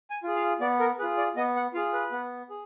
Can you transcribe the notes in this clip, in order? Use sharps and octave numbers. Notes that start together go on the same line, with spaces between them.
G#5
F4 G#4
F5
B3 D5
A#4
F4 G#4 B4
D5
B3 D#5
F#5
F4 G#4 F5
B4
B3
G#4